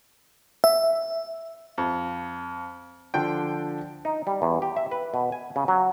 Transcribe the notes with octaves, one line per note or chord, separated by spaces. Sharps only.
E5
F2
D3 F3 D4 G5
D#4
G3
E2
G4
E5
B4
B2
G#5
C#3
F#3